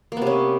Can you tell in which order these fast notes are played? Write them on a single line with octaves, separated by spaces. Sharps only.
A#3 B3 C3 C#4